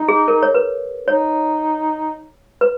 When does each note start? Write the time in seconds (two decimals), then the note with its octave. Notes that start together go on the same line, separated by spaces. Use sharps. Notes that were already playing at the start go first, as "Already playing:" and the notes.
Already playing: D#4
0.08 G#4
0.28 A#4
0.43 C#5
0.55 B4
1.08 D#4 C#5
2.61 B4